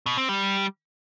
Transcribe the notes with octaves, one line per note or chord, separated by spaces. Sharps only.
B2
C4
G3